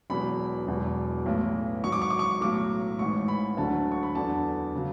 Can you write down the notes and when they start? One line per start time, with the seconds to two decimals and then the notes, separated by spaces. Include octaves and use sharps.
0.10 E1 E2 B2 F#3 B5
0.68 E1 E2 B2 F#3
1.26 B1 A2 E3
1.83 G#1 G#2 F#3 C#6
1.92 D6
2.01 C#6
2.10 D6
2.19 C#6
2.41 B1 A2 F#3 D6
2.99 A1 G#2 E3 C#6
3.28 B5
3.57 D2 D3 F#3 A5
3.92 C#6
4.03 B5
4.15 E2 D3 F#3 A5
4.76 C#3 F#3